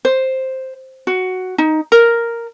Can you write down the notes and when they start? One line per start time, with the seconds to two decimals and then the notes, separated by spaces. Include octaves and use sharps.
0.05 C5
1.07 F#4
1.58 D#4
1.92 A#4